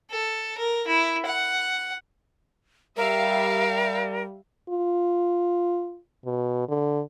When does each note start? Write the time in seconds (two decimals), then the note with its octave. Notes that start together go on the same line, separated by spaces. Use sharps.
0.11 A4
0.58 A#4
0.87 E4
1.26 F#5
2.97 G3 A#4 E5 F5
4.69 F4
6.25 B2
6.69 D3